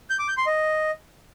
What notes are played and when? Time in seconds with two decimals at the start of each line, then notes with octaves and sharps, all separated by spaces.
0.10 G6
0.19 D6
0.28 G6
0.37 C6
0.47 D#5